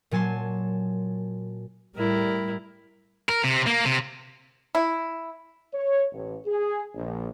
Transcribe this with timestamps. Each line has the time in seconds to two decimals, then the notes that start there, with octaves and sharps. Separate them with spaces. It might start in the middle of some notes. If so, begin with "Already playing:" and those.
0.11 A#2 F#3 G#5 A5 C6
1.95 A2 G3 E4 A#4
3.29 A#4
3.44 C3
3.67 A#3
3.85 C3
4.75 E4
5.74 C#5
6.13 A1
6.47 G#4
6.95 A#1